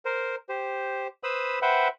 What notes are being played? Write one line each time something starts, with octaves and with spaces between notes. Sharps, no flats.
A#4 C5
G4 C5
B4 C5 B5 D#6 E6
B4 C5 E5 F#5 G5 B5